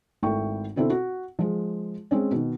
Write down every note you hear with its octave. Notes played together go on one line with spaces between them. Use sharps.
G#1 A3 E4 G5 C#6
B2 D3 C4 E4 A4
F#4
F3 G#3
G#3 C4 C#4
B2 D#3